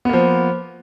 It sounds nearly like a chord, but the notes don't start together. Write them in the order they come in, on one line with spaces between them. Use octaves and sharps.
B3 A#3 F3